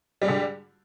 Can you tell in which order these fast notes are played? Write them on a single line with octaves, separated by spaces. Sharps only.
G3 G#3 D3